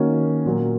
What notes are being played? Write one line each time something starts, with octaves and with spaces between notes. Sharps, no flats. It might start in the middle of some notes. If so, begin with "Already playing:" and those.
Already playing: D#3 A#3 C#4 F#4
A#2 F#3 A#3